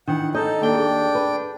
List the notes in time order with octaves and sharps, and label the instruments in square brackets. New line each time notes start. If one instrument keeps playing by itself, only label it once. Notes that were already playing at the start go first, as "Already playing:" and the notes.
[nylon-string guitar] D#3 E3 [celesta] D4 [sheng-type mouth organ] F#5
[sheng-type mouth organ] D#4 A4 [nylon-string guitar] D#5 [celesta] G6
[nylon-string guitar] D#2 [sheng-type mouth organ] D4 G5 [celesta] A4 G7
[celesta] G#4 A4
[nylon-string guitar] B4